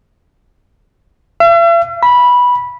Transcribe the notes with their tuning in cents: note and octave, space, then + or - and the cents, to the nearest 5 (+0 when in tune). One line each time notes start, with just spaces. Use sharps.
E5 +45
B5 -10